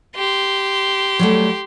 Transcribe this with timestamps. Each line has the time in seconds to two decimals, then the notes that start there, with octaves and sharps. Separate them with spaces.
0.16 G4 C6
1.19 F#3 G3 A3